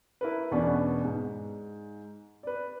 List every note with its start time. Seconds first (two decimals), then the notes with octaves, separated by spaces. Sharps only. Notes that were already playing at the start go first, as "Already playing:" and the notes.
0.21 E4 A#4 B4
0.51 E2 B2 B3 C#4 D4
1.05 G#2
2.43 B4 D5